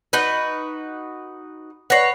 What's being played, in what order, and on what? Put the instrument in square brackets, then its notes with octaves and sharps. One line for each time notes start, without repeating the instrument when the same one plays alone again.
[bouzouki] D#4 F#4 B4
[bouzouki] B4 C#5 [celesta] F#5 A#6 C7